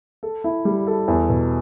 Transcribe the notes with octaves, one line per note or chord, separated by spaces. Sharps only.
A4
E4
G3
A4
E2
B2